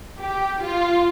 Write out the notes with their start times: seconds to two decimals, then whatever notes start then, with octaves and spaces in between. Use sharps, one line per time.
0.20 G4
0.62 F4